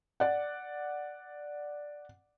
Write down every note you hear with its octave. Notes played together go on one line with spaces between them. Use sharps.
D5 F#5